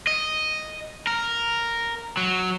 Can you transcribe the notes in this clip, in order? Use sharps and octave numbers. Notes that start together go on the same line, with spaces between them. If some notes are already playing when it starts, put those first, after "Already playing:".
D#5
A#4
F#3